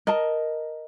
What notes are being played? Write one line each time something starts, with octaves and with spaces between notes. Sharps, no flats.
A#4 D#5 A5